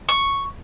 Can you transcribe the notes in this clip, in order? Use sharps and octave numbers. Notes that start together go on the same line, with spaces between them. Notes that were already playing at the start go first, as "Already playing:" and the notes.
C#6